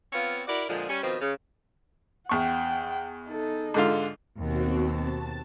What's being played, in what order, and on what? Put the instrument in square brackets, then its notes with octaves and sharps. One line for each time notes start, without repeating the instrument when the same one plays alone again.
[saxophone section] B3 C4 F4 C#5 F5
E4 F#4 A#4 D5
A#2 D3 F3 G#3
G3 C#4
B2 D#3 F3 C4
C#3
[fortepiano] E2 C#6 [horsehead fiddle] F#5 G5
[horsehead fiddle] D#4 A4
[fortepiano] G#2 D3 F4
[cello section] D#2 [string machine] B2 C4 F#4
[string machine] A5